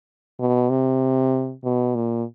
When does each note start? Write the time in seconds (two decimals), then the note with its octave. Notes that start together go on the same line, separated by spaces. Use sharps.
0.40 B2
0.70 C3
1.64 B2
1.95 A#2